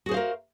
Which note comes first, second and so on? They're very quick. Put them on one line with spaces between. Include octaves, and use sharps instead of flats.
F#4 G#4 C5 F5 A#4